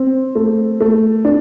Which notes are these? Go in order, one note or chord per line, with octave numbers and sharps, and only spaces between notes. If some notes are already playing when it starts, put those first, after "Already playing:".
Already playing: C4
A3
A3
D4